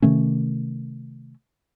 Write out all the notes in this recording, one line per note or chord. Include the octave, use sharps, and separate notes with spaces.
C3 D#3 A3 C#4